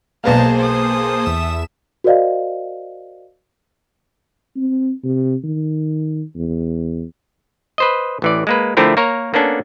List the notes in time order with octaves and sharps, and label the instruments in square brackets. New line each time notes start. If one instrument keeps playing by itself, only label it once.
[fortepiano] B1 B3 F5 [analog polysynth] A#3 G#4 C5 [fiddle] A5 A#5
[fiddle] A4 D#6
[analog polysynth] E2 E5 E7
[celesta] F#4 A#4 C5 D5 D#5 F5
[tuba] C4
C3
D#3
E2
[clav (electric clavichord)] B4 C5 D#5
A1 E3 D5
G#3 A#3 B4
D3 F3 A3 C4 E4 A#4
A#3 A#4 C#5 A#5
A#3 B3 C#4 D4 A4